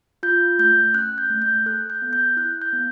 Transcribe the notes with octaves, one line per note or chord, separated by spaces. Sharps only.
F4 G6
A3 G6
C#4 F#6
G6
A3
G6
A4 F#6
G6
B3
G6
E4 F#6
G6
B3